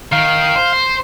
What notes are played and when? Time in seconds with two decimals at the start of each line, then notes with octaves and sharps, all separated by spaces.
0.12 D#3 F5
0.56 C5